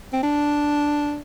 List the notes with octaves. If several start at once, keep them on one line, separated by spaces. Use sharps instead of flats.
C4
D4